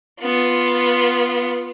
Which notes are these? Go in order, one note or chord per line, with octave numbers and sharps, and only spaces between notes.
B3 F4